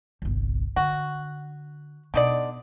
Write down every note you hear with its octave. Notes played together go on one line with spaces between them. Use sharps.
G1 C2
D3 F#4
B2 D3 D#4 D5